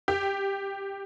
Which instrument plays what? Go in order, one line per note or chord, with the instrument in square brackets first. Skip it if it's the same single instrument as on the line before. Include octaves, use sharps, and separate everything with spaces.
[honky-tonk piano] G4